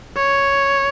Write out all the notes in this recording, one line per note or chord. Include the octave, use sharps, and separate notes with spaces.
C#5